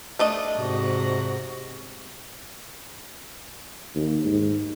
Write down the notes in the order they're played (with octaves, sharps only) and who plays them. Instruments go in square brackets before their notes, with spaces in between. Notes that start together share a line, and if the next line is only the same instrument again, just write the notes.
[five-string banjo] A3 D4 D#5
[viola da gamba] G#2 C3 F#4
[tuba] D#2
G#2